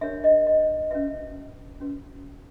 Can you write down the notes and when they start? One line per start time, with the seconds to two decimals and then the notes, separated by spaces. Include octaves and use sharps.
0.01 D4 G4 A#4 C#5 E5
0.24 D#5
0.46 D#5
0.91 C#4 F#4 B4 E5
1.80 C#4 F#4 B4